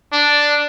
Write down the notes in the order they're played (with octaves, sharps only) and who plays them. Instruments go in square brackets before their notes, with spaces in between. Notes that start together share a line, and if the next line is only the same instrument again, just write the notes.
[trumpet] D4